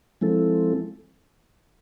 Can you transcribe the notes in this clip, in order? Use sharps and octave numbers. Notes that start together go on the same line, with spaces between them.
F3 G#3 C4 E4 A4